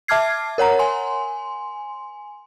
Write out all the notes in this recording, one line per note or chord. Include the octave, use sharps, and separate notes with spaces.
E5 A5 D6 F6 G#6 C7
A#4 C#5 F#5 A#5
G#5 C6